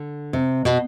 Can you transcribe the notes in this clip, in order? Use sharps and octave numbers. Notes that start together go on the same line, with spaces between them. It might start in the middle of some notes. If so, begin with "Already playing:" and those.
Already playing: D3
C3
B2